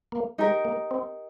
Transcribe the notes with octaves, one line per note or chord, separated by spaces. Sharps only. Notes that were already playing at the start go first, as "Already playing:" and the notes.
A#3
G#3 D#4 G4 A#4
A#3
C4